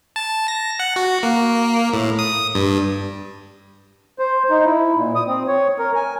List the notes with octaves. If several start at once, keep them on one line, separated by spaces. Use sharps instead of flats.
A5
A#6
F#5
F#4
A#3
A2
D#6
G2
C5
D#4
E4
A#2
D#6
C4
C#5
A#4
G#5